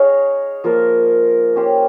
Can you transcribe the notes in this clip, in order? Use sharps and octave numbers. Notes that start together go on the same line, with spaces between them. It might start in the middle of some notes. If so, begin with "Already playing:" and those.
Already playing: D#4 G#4 C#5 F5
F3 A#3 F4 A#4
C#4 G4 C5 F5